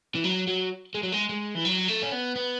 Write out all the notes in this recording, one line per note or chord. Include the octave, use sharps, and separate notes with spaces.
E3
F#3
F#3
G#3
F#3
G#3
G#3
E3
F#3
A3
C#4
B3
B3